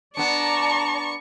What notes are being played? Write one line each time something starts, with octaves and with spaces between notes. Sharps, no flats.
B3 D4 D5 A5 A#5 C#6